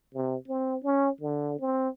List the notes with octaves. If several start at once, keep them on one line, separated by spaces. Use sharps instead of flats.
C3
C4
C#4
D3
C4